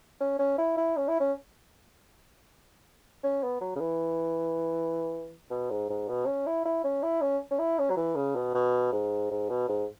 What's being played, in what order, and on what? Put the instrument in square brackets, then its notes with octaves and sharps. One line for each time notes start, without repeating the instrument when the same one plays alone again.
[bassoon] C#4
C#4
E4
E4
C#4
E4
C#4
C#4
B3
F#3
C#3
E3
B2
G#2
G#2
B2
C#4
E4
E4
C#4
E4
C#4
C#4
E4
C#4
F#3
E3
C#3
B2
B2
G#2
G#2
B2
G#2